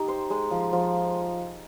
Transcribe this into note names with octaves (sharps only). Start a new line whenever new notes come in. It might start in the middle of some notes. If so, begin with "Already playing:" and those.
Already playing: D#4 G4
C5
G#3
F3
F3